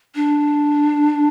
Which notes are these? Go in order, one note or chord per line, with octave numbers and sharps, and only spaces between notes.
D4